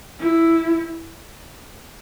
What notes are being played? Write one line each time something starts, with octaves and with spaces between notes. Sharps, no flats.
E4